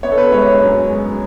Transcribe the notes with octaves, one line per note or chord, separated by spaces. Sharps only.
B3 C#5
A4
B4
G#3 C#5
C#5
F#2
G#3